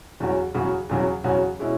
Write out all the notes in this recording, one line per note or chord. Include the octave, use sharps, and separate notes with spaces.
E2 C#3 F#3 C#4 F#4
E2 C#3 F#3 C#4 F#4
E2 C#3 F#3 C#4 F#4
E2 C#3 F#3 C#4 F#4
B2 G#3 C#4 E4